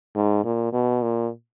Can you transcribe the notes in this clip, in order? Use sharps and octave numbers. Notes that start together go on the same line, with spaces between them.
G#2
A#2
B2
A#2